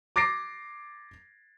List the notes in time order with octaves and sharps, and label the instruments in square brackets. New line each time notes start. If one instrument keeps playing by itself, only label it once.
[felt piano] D6 A6 A#6 C7 D7